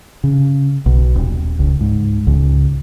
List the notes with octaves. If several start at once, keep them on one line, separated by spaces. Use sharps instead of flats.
C#3
B1
D#1
C#2
G#2
C#2